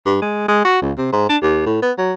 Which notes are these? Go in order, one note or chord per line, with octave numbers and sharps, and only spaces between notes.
G2
G#3
G#3
F#4
C#2
C3
G#2
D4
D#2
A2
B3
F#3